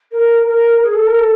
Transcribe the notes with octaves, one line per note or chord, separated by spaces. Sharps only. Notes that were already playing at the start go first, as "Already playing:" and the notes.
A#4
A#4
G#4
A4
A#4
A4